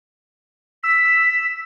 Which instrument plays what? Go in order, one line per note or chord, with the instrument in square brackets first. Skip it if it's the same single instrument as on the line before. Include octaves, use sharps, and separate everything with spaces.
[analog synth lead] E6 [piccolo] B6